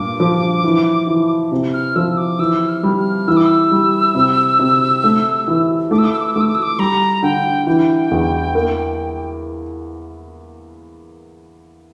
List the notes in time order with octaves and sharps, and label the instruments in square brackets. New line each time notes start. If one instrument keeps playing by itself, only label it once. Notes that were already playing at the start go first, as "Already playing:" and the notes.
Already playing: [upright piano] G2 A#2 [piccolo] D6
[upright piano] F3
E3
E3
C3
[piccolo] F6
[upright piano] F3 [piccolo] E6
[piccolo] D6
[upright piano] E3 [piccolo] E6
[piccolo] F6
[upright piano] G3
[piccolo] F6
[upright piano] E3 [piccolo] E6
[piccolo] D6
E6
[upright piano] G3
C3
C3
A3
E3
[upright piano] A3 [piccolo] D6
[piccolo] E6
D6
E6
D6
E6
[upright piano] A3 [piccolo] D6
[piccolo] E6
D6
E6
D6
[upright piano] G3 [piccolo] A#5
[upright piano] D3 [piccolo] G5
[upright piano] E3 [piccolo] G5
[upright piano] E2
A#3